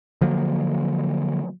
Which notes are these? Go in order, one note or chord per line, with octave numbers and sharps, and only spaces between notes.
D3 F3 F#3 A#3